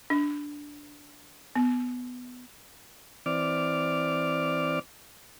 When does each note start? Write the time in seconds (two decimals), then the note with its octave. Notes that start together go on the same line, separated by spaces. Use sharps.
0.10 D4
1.55 B3
3.26 E3 C4 D5 D6 F6